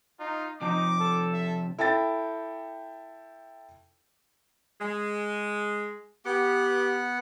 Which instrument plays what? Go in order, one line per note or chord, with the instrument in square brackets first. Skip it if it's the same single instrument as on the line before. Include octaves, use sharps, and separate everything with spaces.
[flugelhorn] D#4 [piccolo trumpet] F4
[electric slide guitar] C3 F3 [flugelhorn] D#4 [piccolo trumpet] D6
[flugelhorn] A4
[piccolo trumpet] E5
[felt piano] E4 A4 G5 A6
[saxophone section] G#3
[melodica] B3 F#5 [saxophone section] G4